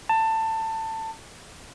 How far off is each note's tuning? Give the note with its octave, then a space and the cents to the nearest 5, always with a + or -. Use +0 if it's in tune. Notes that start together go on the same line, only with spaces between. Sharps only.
A5 +20